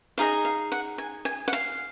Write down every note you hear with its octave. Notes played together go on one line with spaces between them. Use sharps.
D#4 G#4 D#5 F5
F5
F#5
G#5
G#5
F#5
F5